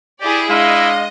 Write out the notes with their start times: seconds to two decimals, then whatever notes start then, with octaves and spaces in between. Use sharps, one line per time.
0.20 E4 G4 G#4 D5
0.50 G#3 D4 E4 D#5 F5